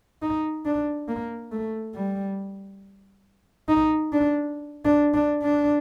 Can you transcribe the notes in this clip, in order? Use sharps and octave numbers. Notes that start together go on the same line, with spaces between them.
D#4
D4
A#3
A3
G3
D#4
D4
D4
D4
D4